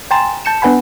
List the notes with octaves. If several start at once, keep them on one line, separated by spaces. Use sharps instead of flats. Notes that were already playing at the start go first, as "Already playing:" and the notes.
G5 G#5 A#5 C6 A6 E7
A5 G6 C#7 E7
B3 D4 B4 F#5 G#5 B5